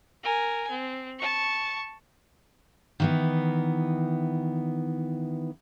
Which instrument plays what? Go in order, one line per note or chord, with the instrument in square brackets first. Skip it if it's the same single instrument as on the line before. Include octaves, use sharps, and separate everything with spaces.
[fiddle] A#4 G#5
C4
A5 C#6
[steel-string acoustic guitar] D#3 E3 B3